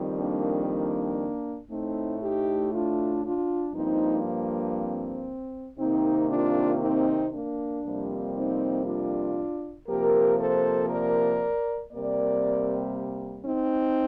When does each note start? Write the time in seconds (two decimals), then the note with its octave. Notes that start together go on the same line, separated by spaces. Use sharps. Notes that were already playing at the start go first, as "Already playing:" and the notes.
Already playing: F2 D#3 G3
0.16 A#3 D4
0.67 A#3 D4
1.69 A2 A3 C4 D#4
2.21 D#4 G4
2.72 D4 F4
3.23 D4 F4
3.74 G2 F3 A#3 C4 D#4
4.76 C4
5.79 C3 D#3 A#3 C4 D#4
6.30 D4 F4
6.81 C4 D#4
7.32 A#3 D4
7.83 F2 C3 G3 A#3
8.34 C4 D#4
8.86 D4 F4
9.88 C3 F3 A#3 G4 A#4
10.39 A4 C5
10.90 A#4 D5
11.93 C3 G3 A#3 A#4 D5
13.45 C4 D#4